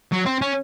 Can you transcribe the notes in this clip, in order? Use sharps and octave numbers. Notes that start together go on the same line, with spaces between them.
F#3
C4
C#4